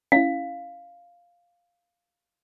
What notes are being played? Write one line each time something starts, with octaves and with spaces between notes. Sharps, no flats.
C#4 E4 F5